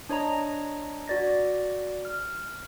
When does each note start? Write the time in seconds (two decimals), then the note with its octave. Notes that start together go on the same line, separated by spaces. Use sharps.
0.09 D4 C#5 D#5 A#5
1.08 F#4 D5 A#6
2.05 F6